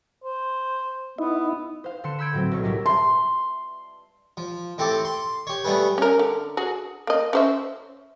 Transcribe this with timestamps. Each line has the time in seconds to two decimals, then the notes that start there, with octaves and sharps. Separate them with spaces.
0.24 C5
1.19 B3 D#4 E4
1.84 C5 F5
2.04 D3 C6 C#7 E7
2.19 B5 C6 E6 G6 G#6 D7
2.33 A2 F#3 C4
2.51 B1 A2 C#3 C#6
2.64 G3 D4 E4 G4 A#4 D#5
2.86 C6
4.37 F3
4.78 A2 C4 G4 A4 A5 D6
5.05 C6
5.47 G4 C#5
5.64 G3 A3 B3 G#4 B4
5.98 C#4 A#4
6.19 D3
6.57 F#4 G#4
7.07 A#3 D#5
7.33 C#4 C5 E5